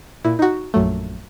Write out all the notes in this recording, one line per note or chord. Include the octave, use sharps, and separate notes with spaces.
A#2 E4
D#4 F#4
A#1 F#2 F#3 A3